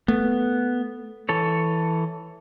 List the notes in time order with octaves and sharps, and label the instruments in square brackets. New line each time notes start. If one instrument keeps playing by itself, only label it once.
[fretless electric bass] A3 [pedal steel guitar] B3
[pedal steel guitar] E3 A4 C#5